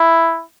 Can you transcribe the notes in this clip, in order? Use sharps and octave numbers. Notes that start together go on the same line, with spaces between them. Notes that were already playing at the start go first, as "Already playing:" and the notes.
Already playing: E4